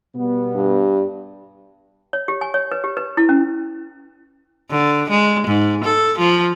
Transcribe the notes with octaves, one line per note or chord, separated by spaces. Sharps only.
B2 G3 B3
G2
C#5
G4
G#5
C#5
B4
G4
B4
E4
C#4
D3
G#3
G#2
A4
F3